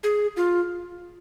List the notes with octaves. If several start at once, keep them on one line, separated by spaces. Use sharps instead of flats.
G#4
F4